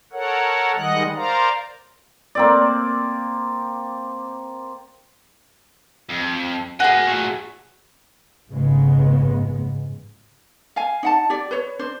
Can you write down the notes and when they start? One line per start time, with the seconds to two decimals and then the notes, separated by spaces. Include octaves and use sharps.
0.12 A4 A#4 C#5 F#5
0.76 D#3 G3 G#3 D#5 F#5 F#6
1.15 A#4 C5 D5 F5 A#5
2.35 A#3 C4 D5
6.09 F2
6.80 F#4 G#4 A#4 G#5
7.07 A#2 A3
8.48 A1 F2 G#2 C#3 G#3 B3
10.76 F5 G#5
11.03 D#4 F#5 A5
11.30 G4 D5
11.51 B4 C#5
11.79 D4 C5